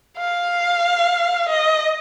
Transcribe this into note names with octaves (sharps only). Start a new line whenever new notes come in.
F5
D#5